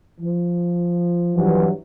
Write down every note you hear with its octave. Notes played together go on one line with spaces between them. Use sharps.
F3
G2 E3 F#3